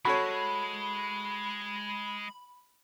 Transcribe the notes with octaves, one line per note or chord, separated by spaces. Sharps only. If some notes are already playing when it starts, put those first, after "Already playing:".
G#3 F#4 A4 C#5 B5